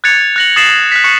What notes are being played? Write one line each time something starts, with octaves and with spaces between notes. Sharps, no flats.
F#6 G#6 A6 C#7 F7
F#6 A#6 F#7
D#6 A6 A#6 C7 E7 F#7
F#6 B6
C#6 F#6 C#7